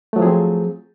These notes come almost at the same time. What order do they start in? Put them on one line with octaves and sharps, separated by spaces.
A3 F#3 F3 G#4 C4